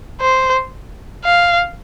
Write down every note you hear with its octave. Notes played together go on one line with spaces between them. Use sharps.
C5
F5